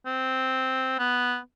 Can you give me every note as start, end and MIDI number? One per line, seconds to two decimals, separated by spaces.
0.06 0.98 60
0.99 1.38 59